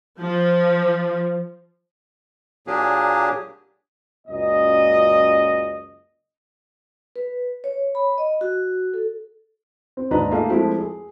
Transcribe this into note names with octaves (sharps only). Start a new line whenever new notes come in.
F3
A#2 F#3 A#3 D4 G4 G#4
C#2 F#2 A#2 D#5
B4
C#5
B5
D#5
F#4
A4
C4
D#2 G#2 D4 B4 D#5 A#5
A3 A#3 F4 G#4
F3 G#3 A3 C4 E4 G4
G#4